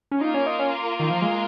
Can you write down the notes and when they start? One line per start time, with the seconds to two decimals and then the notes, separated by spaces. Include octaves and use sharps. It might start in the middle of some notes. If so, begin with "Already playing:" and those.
0.11 C#4
0.21 A#3 D#4 F4 A#4
0.34 C#4
0.46 D#4
0.59 C#4
1.00 D#3
1.10 F3
1.22 G#3